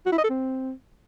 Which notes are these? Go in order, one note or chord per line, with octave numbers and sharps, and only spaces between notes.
F#4
E4
D#5
A4
C4